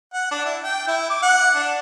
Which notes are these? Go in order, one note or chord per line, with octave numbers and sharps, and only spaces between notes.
F#5
D4
E4
G5
E4
D6
F#5
D4